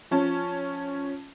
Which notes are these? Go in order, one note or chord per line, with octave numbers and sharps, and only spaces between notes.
F3 C#4 A5